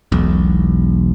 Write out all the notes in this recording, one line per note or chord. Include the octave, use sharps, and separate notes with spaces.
E1 B1